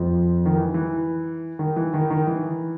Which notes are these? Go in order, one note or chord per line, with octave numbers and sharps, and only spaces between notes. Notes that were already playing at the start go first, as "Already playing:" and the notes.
Already playing: F2 F3
D#3
E3
E3
D#3
E3
D#3
D#3
E3